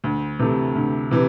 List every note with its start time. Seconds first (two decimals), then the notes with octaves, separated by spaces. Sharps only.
0.04 D2
0.39 C3 E3 A3
0.75 D2
1.11 C3 E3